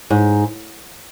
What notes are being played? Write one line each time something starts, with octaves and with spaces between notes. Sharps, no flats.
G#2